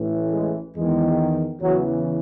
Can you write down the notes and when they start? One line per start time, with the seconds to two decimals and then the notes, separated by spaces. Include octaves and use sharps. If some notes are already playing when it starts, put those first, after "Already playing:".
Already playing: A1 A2 E3
0.32 G#3
0.76 E2 D#3 G#3
1.60 E2 C#3 E3 F#3